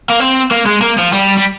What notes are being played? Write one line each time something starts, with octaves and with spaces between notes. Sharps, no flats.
A#3
C4
A#3
G#3
A#3
F3
G3
G3